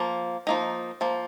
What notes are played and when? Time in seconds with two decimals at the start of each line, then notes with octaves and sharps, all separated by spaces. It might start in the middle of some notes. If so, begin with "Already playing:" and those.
Already playing: F3 A#3
0.47 F3 A#3 D#4
1.01 F3 A#3